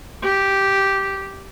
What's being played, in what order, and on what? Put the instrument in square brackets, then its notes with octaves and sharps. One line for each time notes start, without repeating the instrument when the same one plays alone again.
[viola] G4